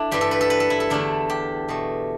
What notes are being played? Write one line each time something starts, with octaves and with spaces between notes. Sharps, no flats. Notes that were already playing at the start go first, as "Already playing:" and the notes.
Already playing: A3 D4 E4
G2 E3 G3 G4
A4
B4
A4
B4
A4
E4
A4
E2 D3 A3 D4
G4
B2 A3